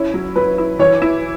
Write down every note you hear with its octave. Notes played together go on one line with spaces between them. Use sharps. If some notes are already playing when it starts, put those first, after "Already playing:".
Already playing: C#4 E4 C#5
F#3
F#3 B4
E4
E3 C#5
E4